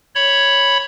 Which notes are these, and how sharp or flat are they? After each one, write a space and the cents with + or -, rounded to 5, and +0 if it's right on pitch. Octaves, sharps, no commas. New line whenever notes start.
C#5 +0 B5 +0